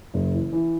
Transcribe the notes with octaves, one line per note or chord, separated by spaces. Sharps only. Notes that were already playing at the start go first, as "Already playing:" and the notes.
F#1
E3
E3